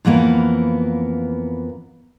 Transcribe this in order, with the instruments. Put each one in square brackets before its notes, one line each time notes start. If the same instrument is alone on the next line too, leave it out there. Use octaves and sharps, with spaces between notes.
[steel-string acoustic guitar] F2 E3 A#3 B3 A#4